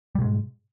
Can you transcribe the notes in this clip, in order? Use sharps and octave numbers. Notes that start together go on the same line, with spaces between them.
G#2 B2 G3 G#3